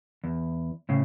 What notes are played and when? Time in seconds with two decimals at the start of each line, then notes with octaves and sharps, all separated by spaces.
0.24 E2
0.89 A2 C#3